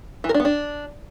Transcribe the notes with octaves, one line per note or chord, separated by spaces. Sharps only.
E3
A#4
D4
B3
D4